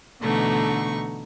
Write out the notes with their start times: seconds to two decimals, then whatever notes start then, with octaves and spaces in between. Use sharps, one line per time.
0.23 B2 D3 E3 A3 D#4 C#6